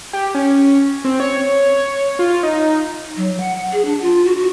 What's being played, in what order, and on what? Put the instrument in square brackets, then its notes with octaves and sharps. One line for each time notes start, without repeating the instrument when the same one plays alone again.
[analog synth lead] G4
C#4
C4
C#5
F4
D#4
[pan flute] F#3
F#5
G#4
D4
F4
F#4
F#4